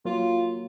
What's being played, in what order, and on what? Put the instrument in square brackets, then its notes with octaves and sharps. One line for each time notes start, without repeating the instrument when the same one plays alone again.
[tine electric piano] F#3 A#3 [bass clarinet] F4